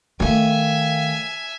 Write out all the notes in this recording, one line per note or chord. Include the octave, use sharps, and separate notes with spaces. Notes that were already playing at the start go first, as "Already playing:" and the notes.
D#3 A3 E5 F5 G5 G#5